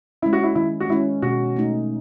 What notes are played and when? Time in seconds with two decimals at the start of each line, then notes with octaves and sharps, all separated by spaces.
0.22 G#3 C#4 E4
0.33 F#4
0.44 E4
0.55 D#3 E4
0.80 F#4
0.89 G#3 C#4 E4
1.22 B2 F#4
1.56 A3 D#4